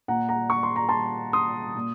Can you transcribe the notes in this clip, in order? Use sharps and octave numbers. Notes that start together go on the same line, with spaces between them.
A#2 F#5 A#5
F#5 A#5
C#6
C6
A#5
A5 C6
C6 D#6
A#2